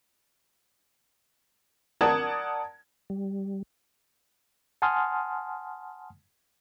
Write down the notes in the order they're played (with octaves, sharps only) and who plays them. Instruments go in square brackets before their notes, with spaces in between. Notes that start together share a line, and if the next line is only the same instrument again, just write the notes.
[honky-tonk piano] A#4 D5 F#5 A5 D#6 G#6
[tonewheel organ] G3
[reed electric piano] F#5 G#5 A5 C6 D#6 F6